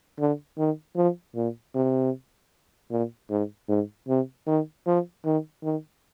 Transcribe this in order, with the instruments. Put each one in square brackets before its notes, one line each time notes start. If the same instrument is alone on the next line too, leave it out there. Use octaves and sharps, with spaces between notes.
[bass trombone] D3
D#3
F3
A#2
C3
A#2
G#2
G#2
C3
D#3
F3
D#3
D#3